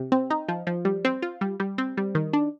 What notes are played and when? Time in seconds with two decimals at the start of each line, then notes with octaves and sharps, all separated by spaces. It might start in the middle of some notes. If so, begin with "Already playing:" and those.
Already playing: C3
0.12 C4
0.30 D#4
0.48 F3
0.67 F3
0.85 G3
1.05 C4
1.22 F4
1.41 G3
1.60 G3
1.78 C4
1.97 G3
2.15 D#3
2.33 D4